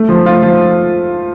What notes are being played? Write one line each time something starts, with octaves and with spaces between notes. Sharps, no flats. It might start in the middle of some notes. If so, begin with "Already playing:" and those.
Already playing: A3
F3
F4
F3